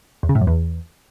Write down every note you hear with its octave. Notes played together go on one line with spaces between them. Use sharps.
E2
C#3
A2
F#2
E2